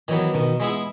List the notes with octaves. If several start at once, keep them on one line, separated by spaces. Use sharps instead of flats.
D#3 E3 F#3 B3
B2 D#3
G#3 B3 E4 G#4